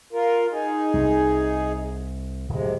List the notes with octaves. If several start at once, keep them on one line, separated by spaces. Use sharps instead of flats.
F4 A#4
D#4 G#4
C2
D1 C3 G#3